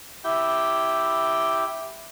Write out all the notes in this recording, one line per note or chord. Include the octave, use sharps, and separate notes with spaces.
E4 G4 G5